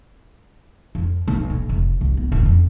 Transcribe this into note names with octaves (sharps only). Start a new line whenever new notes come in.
F2
B1
A#2
F1
C2
B3
D#1
F2